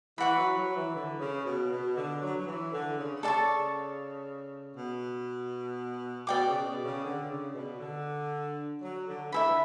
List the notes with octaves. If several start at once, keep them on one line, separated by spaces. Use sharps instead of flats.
E3 B4 F#5 C#6
F#3
F#3
E3
D3
C#3
B2
B2
D3
F#3
F#3
E3
D3
C#3
C#3 A4 D5 A5 C#6
B2
B2 D5 G5 D6
C#3
B2
C#3
D3
C#3
B2
D3
F#3
D3
E3 E4 A4 E5 B5
D3